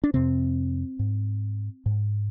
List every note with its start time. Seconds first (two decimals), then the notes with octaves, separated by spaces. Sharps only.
0.04 D4
0.14 F2 C3 C4
0.99 G#2
1.86 G#2